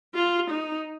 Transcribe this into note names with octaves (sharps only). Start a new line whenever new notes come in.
F4
D#4